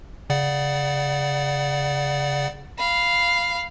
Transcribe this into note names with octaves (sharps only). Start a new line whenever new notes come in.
C#3 D5 F#5
F5 B5